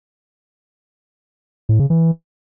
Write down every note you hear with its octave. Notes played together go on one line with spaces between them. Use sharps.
A2
C#3
E3